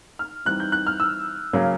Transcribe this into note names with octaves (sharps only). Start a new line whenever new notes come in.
F6
E3 G3 C4 D#4 F#6
G6
F#6
F6
E6
C#3 F#3 A#3